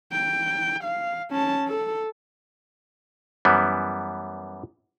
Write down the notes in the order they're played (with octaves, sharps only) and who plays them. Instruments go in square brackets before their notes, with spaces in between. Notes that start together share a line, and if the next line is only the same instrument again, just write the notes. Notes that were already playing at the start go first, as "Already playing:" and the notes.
[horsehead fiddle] G5
F5
C#4 A5
A4
[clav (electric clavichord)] F#2 E3 G3 B3